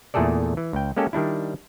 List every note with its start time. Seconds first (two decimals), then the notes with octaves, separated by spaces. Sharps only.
0.14 E2 A#2 A3 G#4 A4 D5
0.57 E3
0.73 C#2 G5
0.97 G#3 A#3 C#4 G4 A4
1.13 D#3 G3 D4 E4